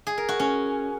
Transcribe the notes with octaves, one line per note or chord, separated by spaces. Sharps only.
G#4
A#4
F#4
C#4